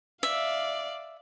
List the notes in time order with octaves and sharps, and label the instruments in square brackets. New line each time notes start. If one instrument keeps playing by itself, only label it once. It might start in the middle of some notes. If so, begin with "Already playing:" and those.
[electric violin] D5 F5 [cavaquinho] E5